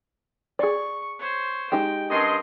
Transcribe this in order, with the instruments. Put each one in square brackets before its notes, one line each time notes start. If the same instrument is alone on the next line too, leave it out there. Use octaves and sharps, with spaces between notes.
[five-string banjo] G#4 D5 [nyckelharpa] C#6
[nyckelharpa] C5 C#5
[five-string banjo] G#3 D#4 G4 [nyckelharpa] G5
[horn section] G2 D#5 C6 [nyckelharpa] C#4 A#4